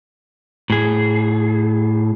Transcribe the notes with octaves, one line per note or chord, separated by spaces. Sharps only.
A2 G#4